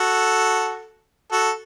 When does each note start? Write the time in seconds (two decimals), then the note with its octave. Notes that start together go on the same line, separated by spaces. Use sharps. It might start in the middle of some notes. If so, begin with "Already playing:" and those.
Already playing: F#4 A4
1.32 F#4 A4